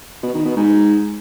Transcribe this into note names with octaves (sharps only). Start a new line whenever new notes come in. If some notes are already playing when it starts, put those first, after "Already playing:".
B2
D#3
B2
G#2